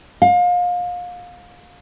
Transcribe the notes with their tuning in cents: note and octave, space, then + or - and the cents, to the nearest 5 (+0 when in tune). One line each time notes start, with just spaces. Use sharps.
F5 +30